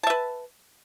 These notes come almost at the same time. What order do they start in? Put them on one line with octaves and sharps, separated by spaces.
A5 E5 B4